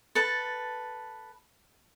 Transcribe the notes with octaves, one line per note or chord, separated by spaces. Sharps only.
A4 B4 A5